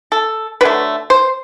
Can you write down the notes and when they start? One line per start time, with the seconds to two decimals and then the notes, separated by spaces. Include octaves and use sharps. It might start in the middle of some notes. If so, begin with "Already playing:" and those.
0.12 A4
0.61 D3 F#3 A3 B4
1.10 C5